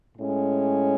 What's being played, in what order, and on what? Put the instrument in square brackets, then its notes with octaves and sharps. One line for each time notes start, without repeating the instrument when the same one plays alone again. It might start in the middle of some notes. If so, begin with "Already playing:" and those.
[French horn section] A2 G#3 C#4